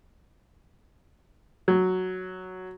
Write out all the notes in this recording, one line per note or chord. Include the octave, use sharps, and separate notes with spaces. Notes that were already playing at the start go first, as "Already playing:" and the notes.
F#3